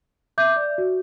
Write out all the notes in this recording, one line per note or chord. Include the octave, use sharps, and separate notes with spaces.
E5 D6 G6
D5
F#4